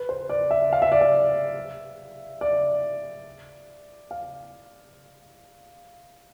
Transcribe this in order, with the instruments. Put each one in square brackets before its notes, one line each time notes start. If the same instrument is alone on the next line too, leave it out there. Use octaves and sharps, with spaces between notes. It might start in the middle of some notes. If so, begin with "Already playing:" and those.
Already playing: [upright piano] B4
C5
D5
E5
F5
E5
D5
E5
D5
F5